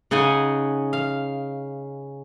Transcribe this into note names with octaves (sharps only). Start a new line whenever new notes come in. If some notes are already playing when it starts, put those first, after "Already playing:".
C#3 D#4 F#5 G#5
F5